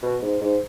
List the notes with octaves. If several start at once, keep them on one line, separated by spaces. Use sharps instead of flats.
B2
G#2
G#2